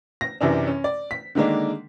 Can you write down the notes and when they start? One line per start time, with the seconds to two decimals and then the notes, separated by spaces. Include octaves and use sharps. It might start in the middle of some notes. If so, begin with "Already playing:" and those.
0.21 A#6
0.41 F#2 C3 E3 D4
0.67 C#4
0.84 D5
1.11 B6
1.35 D3 D#3 G#3 A#3 D4